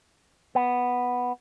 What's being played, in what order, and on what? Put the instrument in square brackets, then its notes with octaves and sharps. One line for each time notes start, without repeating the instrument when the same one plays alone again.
[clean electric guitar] B3